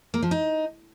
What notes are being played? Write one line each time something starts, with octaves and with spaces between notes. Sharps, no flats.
A#3
F3
D#4